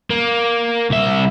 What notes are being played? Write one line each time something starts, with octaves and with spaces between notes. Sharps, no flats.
A#3
C2 E5